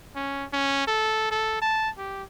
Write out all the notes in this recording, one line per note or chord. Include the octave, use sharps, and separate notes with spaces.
C#4
C#4
A4
A4
A5
G4